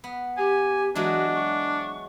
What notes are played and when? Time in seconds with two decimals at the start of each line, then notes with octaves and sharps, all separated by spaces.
0.04 B3
0.37 G4 G#5
0.95 E3 F#3 G#3 D4 F#4
1.35 C#6